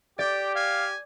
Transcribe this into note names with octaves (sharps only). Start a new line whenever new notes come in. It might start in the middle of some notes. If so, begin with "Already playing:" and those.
G4 D5 G5
F5 G#5